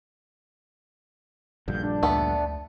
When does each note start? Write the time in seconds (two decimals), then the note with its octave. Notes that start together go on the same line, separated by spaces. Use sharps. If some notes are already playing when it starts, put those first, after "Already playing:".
1.68 A#1 G2 D3 G6
1.84 D4
2.03 D2 A3 B3